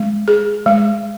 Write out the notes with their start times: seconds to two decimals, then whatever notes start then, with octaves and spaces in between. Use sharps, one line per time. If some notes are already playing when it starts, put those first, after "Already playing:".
Already playing: G#3
0.28 G#4
0.66 G#3